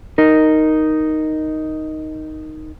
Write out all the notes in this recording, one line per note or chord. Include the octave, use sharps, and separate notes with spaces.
D#4 A#4